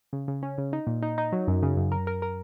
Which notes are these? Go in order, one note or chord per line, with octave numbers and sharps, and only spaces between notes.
C#3
C#3
C#4
C#3
D#4
A#2
D#4
D#4
F#3
F#2
C#3
F#2
A#4
A#4
A#4